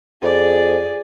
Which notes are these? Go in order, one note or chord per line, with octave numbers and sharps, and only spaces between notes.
F2 G#4 D5